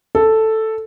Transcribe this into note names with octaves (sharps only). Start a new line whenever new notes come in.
A4